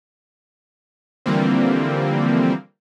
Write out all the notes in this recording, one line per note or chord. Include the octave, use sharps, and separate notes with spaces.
D3 E3 F3 G3 A#3 C4